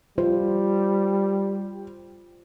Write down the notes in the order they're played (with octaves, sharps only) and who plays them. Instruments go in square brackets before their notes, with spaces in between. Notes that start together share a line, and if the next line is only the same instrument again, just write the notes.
[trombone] G3 [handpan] F4 [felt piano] C5